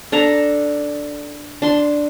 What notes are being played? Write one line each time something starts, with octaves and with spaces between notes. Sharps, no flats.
D4 A4 A#5
D4 C6